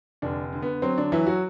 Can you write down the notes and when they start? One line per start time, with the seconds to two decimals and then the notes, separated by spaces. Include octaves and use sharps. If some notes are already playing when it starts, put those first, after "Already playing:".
0.22 F1 D3 D4
0.53 D3
0.62 B3
0.82 F#3 C4
0.98 D3 D4
1.12 E3 F#3 E4
1.26 F#3 F#4